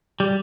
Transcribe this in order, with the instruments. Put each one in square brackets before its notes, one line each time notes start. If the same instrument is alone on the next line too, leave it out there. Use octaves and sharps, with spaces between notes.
[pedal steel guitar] G3